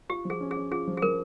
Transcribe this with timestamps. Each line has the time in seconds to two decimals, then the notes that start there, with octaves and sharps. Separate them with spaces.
0.09 F4 G4
0.25 F3
0.30 G#4
0.41 C#4
0.51 G#4
0.57 C#4
0.71 F4 G#4
0.87 F3
0.97 G#4
1.02 F3 A#4